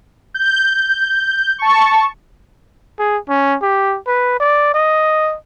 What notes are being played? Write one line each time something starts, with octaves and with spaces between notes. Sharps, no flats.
G6
A5 C#6
G#4
C#4
G4
B4
D5
D#5